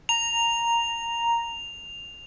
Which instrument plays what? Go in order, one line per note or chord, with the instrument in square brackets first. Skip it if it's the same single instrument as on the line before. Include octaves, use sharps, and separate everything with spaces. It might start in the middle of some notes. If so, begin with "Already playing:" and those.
[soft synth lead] A#5 [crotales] F7